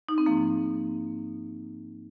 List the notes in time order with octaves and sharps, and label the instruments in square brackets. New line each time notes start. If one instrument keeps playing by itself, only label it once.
[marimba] D#4
C4
G#2 F3 A#3